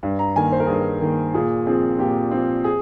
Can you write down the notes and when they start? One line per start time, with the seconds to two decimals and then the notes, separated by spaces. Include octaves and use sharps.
0.03 G2
0.19 A#5
0.36 D#3 A#3 G#5
0.52 C5
0.60 A#4
0.66 G2 G#4
0.74 A#4
1.01 D#3 A#3
1.34 A#2 G#4
1.66 F3 C4 G#4
1.99 A#2 G4
2.31 F3 C4
2.64 G#4